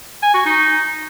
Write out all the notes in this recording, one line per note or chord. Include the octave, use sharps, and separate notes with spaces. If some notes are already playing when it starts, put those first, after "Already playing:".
G#5
F#4
D#4